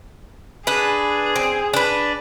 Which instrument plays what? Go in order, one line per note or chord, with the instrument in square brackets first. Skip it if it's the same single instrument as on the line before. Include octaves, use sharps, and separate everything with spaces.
[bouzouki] D4 B4 [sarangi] G#4
[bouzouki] C4
D4 B4